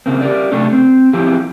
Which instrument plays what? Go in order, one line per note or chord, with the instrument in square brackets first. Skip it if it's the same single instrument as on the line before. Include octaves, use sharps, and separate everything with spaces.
[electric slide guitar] C#3 A#3 C4
G4 A#4 D5
C3 A3 C#4 D4 A4
C4
F3 C4 E4 G4